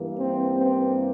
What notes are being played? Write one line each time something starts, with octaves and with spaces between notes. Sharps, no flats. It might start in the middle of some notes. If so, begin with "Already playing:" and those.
Already playing: G2 E3 A#3
C4
C4